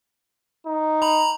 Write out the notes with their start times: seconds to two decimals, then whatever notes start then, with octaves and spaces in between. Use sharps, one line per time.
0.66 D#4
1.02 A#5 B5